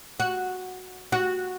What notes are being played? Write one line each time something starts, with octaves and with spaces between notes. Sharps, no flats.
F#4
F#4